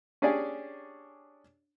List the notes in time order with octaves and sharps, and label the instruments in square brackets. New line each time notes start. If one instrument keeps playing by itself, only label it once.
[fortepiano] C#4 D4 G4 G#4 D5